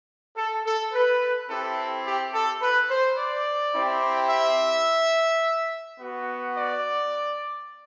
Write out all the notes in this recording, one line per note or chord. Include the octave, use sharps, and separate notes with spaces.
A4
A4
B4
C4 E4 G4 A4
G4
A4
B4
C5
D5
C4 E4 G4
E5
B3 F#4
D5